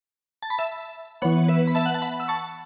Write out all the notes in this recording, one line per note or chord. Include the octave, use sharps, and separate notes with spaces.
A5
B5
E5 A5
E3 B3 C#5 F#5
B4 E5
B5
E5 A5
F#5
A5
F#5 B5
E6
A5 C#6